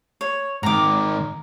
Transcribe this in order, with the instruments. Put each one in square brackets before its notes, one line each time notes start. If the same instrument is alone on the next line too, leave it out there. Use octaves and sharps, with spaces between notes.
[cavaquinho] C#5
[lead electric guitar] G#2 D#3 [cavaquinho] A#5 D6